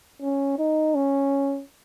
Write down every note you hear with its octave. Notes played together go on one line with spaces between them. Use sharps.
C#4
D#4
C#4